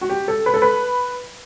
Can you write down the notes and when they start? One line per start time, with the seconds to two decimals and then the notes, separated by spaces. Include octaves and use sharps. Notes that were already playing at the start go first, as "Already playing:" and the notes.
0.01 F#4
0.09 G4
0.28 A4
0.46 B4
0.54 A4
0.62 B4